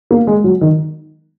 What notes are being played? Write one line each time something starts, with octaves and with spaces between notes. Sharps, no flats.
A#3
G#3
F#3
D#3